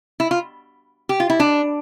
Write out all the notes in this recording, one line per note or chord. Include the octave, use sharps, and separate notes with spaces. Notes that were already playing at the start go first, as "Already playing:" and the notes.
E4
F4
G4
F4
E4
D4